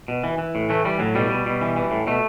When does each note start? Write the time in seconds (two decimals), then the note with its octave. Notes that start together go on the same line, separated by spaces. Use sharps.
0.08 B2
0.24 E3
0.38 E3
0.55 A2
0.69 E3 A3
0.85 E3 G3
0.99 A2 F#3
1.15 B2 G3
1.30 B2
1.46 B2
1.61 E3
1.76 E3
1.91 A2
2.07 B2 A3